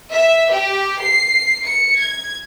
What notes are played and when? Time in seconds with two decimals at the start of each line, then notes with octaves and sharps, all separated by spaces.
0.11 E5
0.51 G4
1.01 C7
1.65 C#7
1.99 G#6